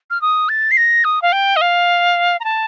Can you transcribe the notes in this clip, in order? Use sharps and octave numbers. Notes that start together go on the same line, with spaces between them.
F6
D#6
A6
C7
A#6
D#6
F5
G5
D#5
F5
A#5
A5